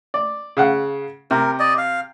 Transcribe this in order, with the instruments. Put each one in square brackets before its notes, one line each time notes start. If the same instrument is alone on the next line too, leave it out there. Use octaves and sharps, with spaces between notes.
[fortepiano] D5
C#3 F5 F#5
[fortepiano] C3 [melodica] A#4
[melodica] D5 D#5
F5